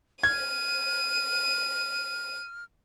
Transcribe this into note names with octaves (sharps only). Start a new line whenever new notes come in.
F6 G#6 D#7